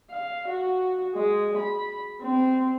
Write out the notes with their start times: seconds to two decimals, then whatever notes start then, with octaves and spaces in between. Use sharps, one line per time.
0.11 F5
0.48 F#4
1.15 G#3
1.57 B5
2.21 C4